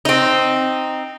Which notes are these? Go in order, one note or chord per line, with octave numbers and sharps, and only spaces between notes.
C4 D#4